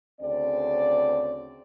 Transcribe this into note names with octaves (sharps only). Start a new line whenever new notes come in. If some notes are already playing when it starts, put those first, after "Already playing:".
D2 C#3 C4 D5